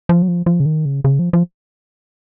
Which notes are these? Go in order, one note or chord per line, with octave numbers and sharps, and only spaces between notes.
F3
F#3
F3
F3
C#3
D#3
C#3
C#3
F3
F3